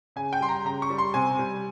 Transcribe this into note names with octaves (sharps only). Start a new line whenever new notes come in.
C#3 G#5
G5
G3 C6
A#5
C#3 A#5
C#6
G3
C6
C3 G#5
G3